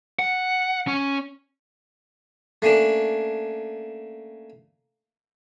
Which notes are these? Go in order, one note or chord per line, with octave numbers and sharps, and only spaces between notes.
F#5
C#4
A3 A#3 C#4 D4